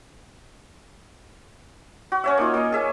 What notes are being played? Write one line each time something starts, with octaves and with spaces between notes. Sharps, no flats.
F#4
C#4 C#5 E5
A#3 D#4 F4
A#3 D#5
G#4 E5